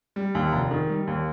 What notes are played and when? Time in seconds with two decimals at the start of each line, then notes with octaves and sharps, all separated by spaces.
0.16 G3
0.35 D#2
0.53 F1
0.71 D#3
0.90 G3
1.07 D#2